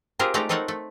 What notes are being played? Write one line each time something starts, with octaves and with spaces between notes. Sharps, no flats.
C4 F4 G4 G#4 A#4
G#3 A3 D#4 G4 D5 A#5
C4 D#4 A4 A#4 C#5 F#5
A3